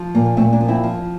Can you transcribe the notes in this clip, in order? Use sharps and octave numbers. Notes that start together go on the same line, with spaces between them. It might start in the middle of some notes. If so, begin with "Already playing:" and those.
Already playing: F3
A#2 A#3
A#3
A#2 A3 C4
A#3 D4
F3
C4 E4
F3